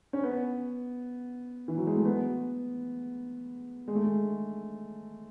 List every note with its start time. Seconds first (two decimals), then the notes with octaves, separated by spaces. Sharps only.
0.13 C#4
0.24 B3
1.68 E3
1.78 F#3
1.87 G#3
1.96 A3
2.05 B3
3.88 G#3
3.95 A3
4.04 G#3